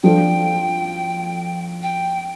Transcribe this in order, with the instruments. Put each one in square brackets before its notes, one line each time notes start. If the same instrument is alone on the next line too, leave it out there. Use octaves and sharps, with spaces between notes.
[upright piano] F3 D4 F4 A4 [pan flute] G5
[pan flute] G5